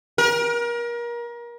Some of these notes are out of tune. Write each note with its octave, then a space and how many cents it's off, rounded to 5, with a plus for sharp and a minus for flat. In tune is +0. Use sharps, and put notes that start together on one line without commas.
A#4 +30